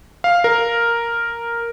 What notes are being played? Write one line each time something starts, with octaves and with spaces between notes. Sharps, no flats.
F5
A#4